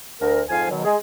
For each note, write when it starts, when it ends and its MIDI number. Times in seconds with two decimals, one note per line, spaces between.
0.21 0.41 38
0.21 0.41 70
0.50 0.70 41
0.50 0.70 44
0.50 0.70 53
0.50 0.70 65
0.50 0.70 77
0.50 0.70 80
0.70 0.81 47
0.70 0.81 51
0.70 0.81 54
0.85 0.96 56
0.85 0.96 68